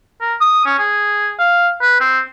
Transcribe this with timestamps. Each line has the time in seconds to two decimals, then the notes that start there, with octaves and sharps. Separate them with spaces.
0.21 A#4
0.41 D#6
0.66 C#4
0.79 G#4
1.39 F5
1.81 B4
2.00 C4